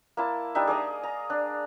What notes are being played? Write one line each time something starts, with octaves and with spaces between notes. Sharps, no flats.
A#3 E4 A5
G3 D4 D#4 E5
G#4 D5 D#5 A#5
A#5
D4